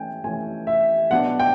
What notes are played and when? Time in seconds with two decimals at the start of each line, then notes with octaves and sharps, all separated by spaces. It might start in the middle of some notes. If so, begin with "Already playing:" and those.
Already playing: E3 A3 C#4 G5 G#5
0.24 E3 A3 C#4 G#5
0.67 E5
1.10 B2 F#3 B3 D4 F#5
1.39 G5